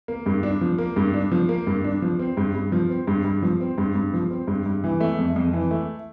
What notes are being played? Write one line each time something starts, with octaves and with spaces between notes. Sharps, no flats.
A#3
G2
D4
F3
A#3
G2
D4
F3
A#3
G2
D4
F3
C4
G2
G2
F3
C4
G2
G2
F3
C4
G2
G2
F3
C4
G2
G2
E3
A3
F2
F2
E3
A3